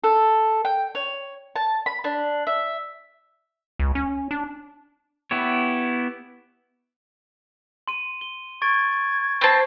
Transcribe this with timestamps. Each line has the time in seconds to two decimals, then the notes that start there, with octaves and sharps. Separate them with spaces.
0.04 A4
0.65 G5
0.95 C#5
1.56 A5
1.86 B5
2.04 D4
2.47 E5
3.79 C#2
3.95 C#4
4.31 D4
5.31 B3 E4 G4 C#5
7.88 C6 D#7
8.21 G7
8.62 C#6 G#6 A6 D7
9.41 C4 C5 A5 B5